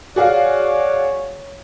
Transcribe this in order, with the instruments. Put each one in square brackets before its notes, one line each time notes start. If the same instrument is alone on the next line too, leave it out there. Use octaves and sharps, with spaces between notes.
[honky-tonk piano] F#4 G#4 F5 [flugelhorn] C#5 [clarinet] D5